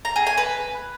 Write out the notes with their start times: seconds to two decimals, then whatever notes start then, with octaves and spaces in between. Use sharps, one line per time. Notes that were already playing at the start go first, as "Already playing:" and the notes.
0.05 A#5
0.16 G#4
0.27 G#5
0.38 B4